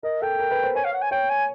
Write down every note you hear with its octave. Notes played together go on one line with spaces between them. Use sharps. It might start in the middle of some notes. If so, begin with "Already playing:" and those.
A#4 D#5
A4 G5
A#4
B4
C5
C#5 G#5
F5
F#5
G#5
C#5 G5
G#5